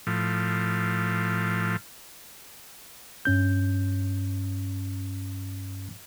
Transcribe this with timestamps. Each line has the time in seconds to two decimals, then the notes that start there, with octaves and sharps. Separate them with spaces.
0.07 A2 F3
3.25 G2 C#4 G6